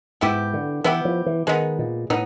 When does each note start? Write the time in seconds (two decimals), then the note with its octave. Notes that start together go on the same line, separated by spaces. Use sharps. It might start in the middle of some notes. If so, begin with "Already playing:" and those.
0.21 G#2 B3 E4 G4
0.54 D3
0.84 E3 B3 E4 G4
1.05 F3
1.26 E3
1.47 D#3 G#3 B3 D#4
1.79 A#2
2.10 A2 B3 D#4